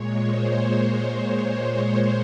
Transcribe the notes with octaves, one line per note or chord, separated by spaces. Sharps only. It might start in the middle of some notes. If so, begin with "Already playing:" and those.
Already playing: A#2 G#3 C#5
C5